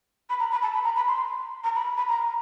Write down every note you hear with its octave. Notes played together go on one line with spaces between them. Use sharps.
B5
A#5
B5
A5
B5
A#5
B5
C6
A#5
B5
B5
A#5